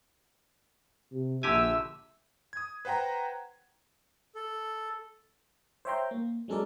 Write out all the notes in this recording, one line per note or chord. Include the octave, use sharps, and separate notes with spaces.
C3
A#1 D3 G4 E5 G#5 E6
D#6 G#6
B4 C5 F#5 G5 A#5
A4
C5 C#5 E5 G5 A#5 C6
A#3
F#3 G#3 C#4 A4 A#4 D5